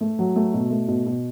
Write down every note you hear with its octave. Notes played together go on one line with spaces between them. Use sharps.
A3
F#3
A3
B2
A3
B2
B2